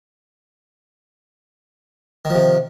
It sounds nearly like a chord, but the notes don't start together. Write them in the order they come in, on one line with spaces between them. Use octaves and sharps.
D#3 F3 C3